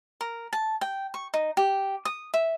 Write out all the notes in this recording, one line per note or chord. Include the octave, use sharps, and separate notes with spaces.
A#4
A5
G5
C#6
D#4
G4
D#6
E5